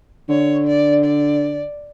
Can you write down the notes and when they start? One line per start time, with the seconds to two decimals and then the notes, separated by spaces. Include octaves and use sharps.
0.29 D3 C#5
0.67 D5
1.04 D5